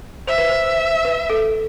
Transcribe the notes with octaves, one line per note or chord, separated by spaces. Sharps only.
C5 E5
B4
C5
B4
A4